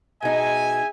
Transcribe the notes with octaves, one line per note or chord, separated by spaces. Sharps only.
B2 D#4 G#4 E5 G#5